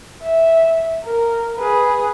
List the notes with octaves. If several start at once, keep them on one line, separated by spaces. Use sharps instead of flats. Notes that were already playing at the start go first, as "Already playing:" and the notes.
E5
A#4
G#4 B4